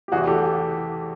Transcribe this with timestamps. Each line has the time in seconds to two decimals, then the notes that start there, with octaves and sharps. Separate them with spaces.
0.08 G4
0.12 E2 C3 E3 F#4 G#4
0.27 G4 A4